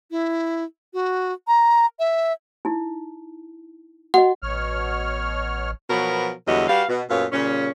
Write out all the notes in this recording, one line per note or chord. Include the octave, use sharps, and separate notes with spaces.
E4
F#4
A#5
E5
D#4 E4
F#4 D#5 F#5
A1 B2 C#5 F6
B2 F3 F#3 B3 F#4 A#4
E2 D3 F#3 G3 F#4 D#5
G3 F#4 B4 F5
B2
F#2 A#2 B3 A4 C#5 F5
A#2 C#3 G3 C#4